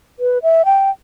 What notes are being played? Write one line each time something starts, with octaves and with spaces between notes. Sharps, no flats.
B4
E5
G5